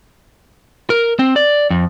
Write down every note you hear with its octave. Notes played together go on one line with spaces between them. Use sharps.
A#4
C4
D5
F2